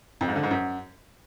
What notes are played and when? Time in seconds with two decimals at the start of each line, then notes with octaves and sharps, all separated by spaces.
0.21 F2
0.28 G#2
0.36 D3
0.43 G#2
0.51 F#2